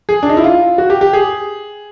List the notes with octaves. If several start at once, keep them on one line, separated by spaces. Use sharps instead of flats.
G#4
D4
D#4
E4
F4
F#4
G4
G4
G#4